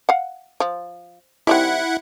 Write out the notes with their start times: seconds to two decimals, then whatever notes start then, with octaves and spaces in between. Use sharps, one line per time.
0.09 F5 F#5
0.60 F3
1.47 D#3 G3 C4 E4 F#5